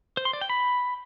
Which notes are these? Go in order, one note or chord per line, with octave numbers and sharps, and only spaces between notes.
C5
C6
D5
G5
B5